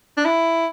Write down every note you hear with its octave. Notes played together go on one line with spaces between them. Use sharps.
D4
E4